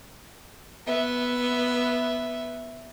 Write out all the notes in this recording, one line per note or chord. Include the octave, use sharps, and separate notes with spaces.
B3 E5